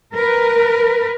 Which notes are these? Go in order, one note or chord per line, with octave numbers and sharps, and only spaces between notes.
A#4 B4